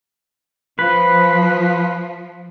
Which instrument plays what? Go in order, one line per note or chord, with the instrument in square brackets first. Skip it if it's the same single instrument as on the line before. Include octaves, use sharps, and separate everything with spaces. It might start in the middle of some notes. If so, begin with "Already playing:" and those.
[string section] F3 [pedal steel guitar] B4